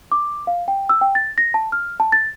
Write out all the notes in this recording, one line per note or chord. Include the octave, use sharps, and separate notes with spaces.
D6
F5
G5
E6
G5
A6
A#6
A5
F6
A5
A6